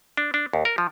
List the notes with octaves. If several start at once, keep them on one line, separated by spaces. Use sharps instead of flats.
D4
D4
D#2
A#4
F3